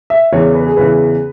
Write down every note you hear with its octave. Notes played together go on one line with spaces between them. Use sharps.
E5
E2 C#3 E3 C#5
B4
G#4
E2 C#3 E3 B4